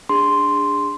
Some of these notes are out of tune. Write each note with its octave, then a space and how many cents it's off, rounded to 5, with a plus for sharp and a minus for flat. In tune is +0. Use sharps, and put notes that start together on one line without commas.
D4 +0 G#4 -25 C6 +0